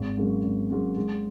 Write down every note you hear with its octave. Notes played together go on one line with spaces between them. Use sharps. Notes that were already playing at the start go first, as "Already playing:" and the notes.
Already playing: G#1
G#2 F#3 A#3 C#4
G#1
G#2 F#3 A#3 C#4
G#2